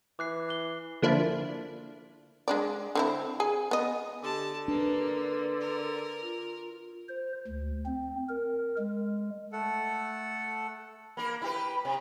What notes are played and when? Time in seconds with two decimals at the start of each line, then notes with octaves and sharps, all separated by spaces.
0.19 E3 D6 F#6 C7
0.49 F#6 G7
1.02 D3 F3 A#3 D4 E4
2.48 G#3 D4 D5
2.95 D3 C4 E4
3.40 G#4 G#5
3.71 B3 D#5
4.23 D3 G4 A5
4.68 A#3 D4 B4
5.60 A#4
6.22 F4
7.09 C5
7.48 D2
7.86 C4
8.29 A#4
8.78 G#3
9.52 A3 A4 F#5
11.17 A#3 A#4 B5
11.42 E4 G4 B4
11.85 C3